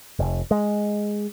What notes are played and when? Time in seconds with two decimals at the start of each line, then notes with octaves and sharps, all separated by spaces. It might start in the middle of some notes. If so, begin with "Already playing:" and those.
0.19 F1
0.51 G#3